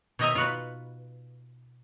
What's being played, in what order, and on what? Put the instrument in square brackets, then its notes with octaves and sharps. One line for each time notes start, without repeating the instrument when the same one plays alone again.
[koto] B2 D#3 D#4 D#5 E5 A#5
F4 F#4 B4